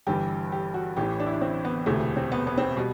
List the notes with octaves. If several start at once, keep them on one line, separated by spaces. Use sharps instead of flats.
G1 G2 E3 G4
G4
F#4
A1 A2 E3 G4
D4
E4
D4
C4
B3
E1 D2 C3 E3 A3
C4
B3
B3
C4
B3
B2 G3